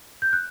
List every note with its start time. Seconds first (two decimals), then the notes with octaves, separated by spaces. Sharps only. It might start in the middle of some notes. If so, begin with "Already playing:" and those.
0.22 G6
0.33 F#6